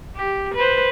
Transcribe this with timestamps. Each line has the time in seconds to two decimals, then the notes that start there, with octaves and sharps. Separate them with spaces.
0.16 G4
0.55 B4 C5